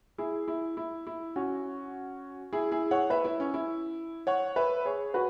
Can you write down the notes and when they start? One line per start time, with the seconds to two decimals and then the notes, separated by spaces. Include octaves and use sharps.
0.18 E4 G#4
0.48 E4
0.77 E4
1.07 E4
1.36 C#4 F#4
2.53 E4 G#4
2.71 E4 G#4
2.91 C#5 F#5
3.10 B4 E5
3.25 E4
3.40 C#4
3.54 E4
4.27 C#5 F#5
4.56 B4 E5
4.85 G#4 C#5
5.14 F#4 B4